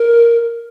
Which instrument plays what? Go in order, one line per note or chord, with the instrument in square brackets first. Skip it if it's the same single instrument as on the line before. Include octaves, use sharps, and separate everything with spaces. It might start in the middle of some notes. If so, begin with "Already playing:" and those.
Already playing: [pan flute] A#4